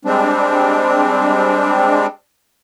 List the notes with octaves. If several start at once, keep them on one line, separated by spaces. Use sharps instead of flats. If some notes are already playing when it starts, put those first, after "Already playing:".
G3 G#3 C4 D4